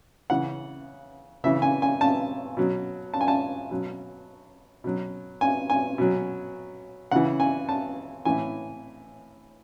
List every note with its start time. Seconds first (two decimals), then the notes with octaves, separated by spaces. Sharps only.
0.30 C#3 E3 F#5
1.44 C#3 E3 E5
1.62 G#5
1.82 G#5
2.01 A5
2.57 B2 F#3
3.14 A5
3.21 G#5
3.28 A5
3.71 B2 F#3
4.84 B2 F#3
5.41 G#5
5.70 G#5
5.98 B2 F#3
7.11 C#3 E3 F#5
7.40 G#5
7.69 A5
8.25 A2 E3 G#5